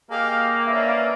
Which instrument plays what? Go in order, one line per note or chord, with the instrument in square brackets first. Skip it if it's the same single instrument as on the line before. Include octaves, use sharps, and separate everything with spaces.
[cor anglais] A#3 [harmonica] G4 D#5 F5 [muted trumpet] G#4
[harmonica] C#4 D4 B4 [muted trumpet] E5